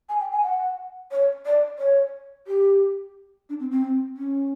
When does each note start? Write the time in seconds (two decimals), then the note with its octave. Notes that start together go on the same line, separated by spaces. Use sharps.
0.09 G#5
0.20 G5
0.32 G#5
0.43 F#5
1.11 C#5
1.46 D5
1.79 C#5
2.47 G4
3.49 D4
3.60 C4
3.71 C4
4.17 C#4